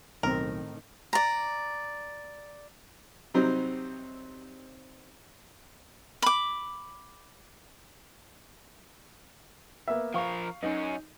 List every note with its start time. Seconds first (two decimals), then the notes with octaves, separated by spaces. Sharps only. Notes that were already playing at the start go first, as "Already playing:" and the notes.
0.23 B1 A2 D#3 C4 D#4 A#4
1.13 D5 A#5
3.34 C3 F#3 G3 C4 D#4 C5
6.22 B5 D6
9.88 A#3 B3 E5
10.14 F3 A#4 F5 C#6
10.63 F#2 C#4 D#4